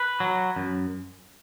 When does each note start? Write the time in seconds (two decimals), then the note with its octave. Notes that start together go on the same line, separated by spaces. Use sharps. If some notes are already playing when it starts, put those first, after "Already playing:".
Already playing: B4
0.20 F#3
0.56 F#2